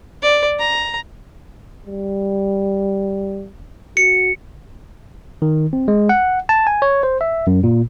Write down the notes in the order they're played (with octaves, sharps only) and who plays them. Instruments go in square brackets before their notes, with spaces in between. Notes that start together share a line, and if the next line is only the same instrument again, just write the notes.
[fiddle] D5
A#5
[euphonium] G3
[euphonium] F#4 [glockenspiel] C#7
[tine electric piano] D#3
C4
G#3
F#5
A5
G#5
C#5
C5
E5
F#2
A#2